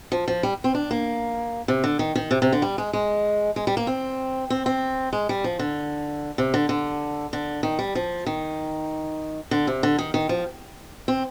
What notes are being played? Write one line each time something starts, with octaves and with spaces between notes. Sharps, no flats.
F3
F3
G3
C4
D4
A#3
C3
D3
D#3
D#3
C3
C3
D3
G3
G#3
G#3
G#3
G3
A#3
C4
C4
C4
G#3
G3
F3
D3
C3
D3
D3
D3
D#3
G3
F3
D#3
D3
C3
D3
D#3
D#3
F3
C4